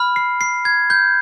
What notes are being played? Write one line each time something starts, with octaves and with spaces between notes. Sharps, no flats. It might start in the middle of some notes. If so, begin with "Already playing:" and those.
Already playing: B5 F6
C7
C7
G#6
G6